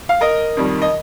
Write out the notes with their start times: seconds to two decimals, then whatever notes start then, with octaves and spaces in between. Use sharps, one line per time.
0.09 F5
0.21 A#4 D#5
0.57 F2 D#3 G3
0.82 D#5